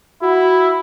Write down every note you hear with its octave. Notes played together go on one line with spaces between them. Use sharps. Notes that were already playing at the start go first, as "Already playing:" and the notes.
E4 F#4